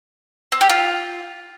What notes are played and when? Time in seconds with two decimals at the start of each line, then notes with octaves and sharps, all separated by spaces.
0.52 C4
0.61 G4
0.69 F4